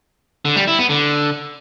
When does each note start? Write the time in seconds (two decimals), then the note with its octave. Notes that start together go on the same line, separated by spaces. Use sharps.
0.45 D3
0.56 G3
0.67 E4
0.79 B3
0.90 D3